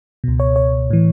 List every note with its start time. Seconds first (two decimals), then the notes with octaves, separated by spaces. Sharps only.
0.24 C#2 B2
0.40 C#5
0.56 C#5
0.91 A2 E3